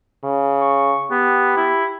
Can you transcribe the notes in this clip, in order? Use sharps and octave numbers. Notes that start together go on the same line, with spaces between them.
C#3
C#6
B3 G4
E4